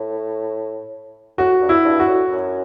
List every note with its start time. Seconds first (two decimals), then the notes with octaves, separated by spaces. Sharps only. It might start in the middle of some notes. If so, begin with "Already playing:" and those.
Already playing: A2
1.38 A2 F#4
1.61 G2
1.69 E4
1.84 G2
2.00 F#4
2.07 A2
2.30 F#2